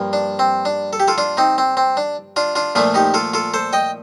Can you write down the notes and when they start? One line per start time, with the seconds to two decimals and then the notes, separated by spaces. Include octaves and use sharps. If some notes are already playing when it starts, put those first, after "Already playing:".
Already playing: G2 F3 A#3
0.13 D4
0.39 C4
0.65 D4
0.93 A4
1.00 G4
1.08 F4 A4
1.18 D4 F4
1.37 C4 D#4
1.58 C4
1.77 C4
1.97 D4
2.36 D4 F4
2.55 D4 F4
2.75 A#2 F3 A3 D4 F4
2.94 D#4 G4
3.14 F4 A4
3.34 F4 A4
3.54 A4 C5
3.73 D#5 G5